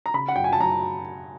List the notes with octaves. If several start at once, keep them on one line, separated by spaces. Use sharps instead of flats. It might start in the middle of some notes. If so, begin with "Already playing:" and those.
A#5
C#3 B5
F#5
F#2 G5
G#5
A5
F#2 A#5